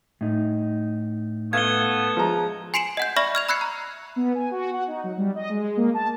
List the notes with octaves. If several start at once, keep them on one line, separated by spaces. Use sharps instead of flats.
A2 D#4
A3 B3 F5 G#6 G7
F3 G#3 A#5
G#5 C6 C7 D7 E7 F#7
D#5 F#5 G6
D5 E5 B5 C#6 F6 A#6
F6 G#6 F7
B5 E6 F#6 G#6 C7 C#7
A#5
B3
G#5
F#4
F#5
D#4
F#3
G3
D#5
G#3
A#3
A5